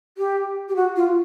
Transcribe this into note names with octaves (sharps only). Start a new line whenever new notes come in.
G4
G4
F#4
F4